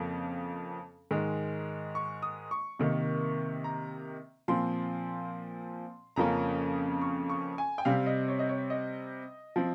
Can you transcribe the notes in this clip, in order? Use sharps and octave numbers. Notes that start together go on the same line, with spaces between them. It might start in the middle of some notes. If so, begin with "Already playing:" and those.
Already playing: F2 C#3 F3 A#3
G#2 D#3 G#3
C#6
D#6
C#6
C3 D#3 A#3
A#5
A#2 F3 C4 C6
F2 C#3 F3 A#3 C#4 A#5
C#6
C#6
G#5
G5
C3 G3 C4 F5
D#5
C#5
D#5
C#5
D#5
F3 C4